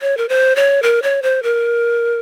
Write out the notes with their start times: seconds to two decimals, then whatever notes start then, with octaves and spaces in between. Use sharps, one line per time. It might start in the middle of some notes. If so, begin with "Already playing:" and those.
0.02 C#5
0.17 A#4
0.29 C5
0.56 C#5
0.83 A#4
1.03 C#5
1.23 C5
1.43 A#4